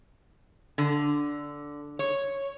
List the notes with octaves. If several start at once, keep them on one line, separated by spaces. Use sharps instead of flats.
D3
C#5